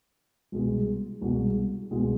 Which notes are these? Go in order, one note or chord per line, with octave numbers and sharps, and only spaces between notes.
C2 B2 G#3
C2 B2 G#3
C2 B2 G#3